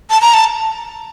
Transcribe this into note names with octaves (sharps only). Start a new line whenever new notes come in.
A5
A#5
A5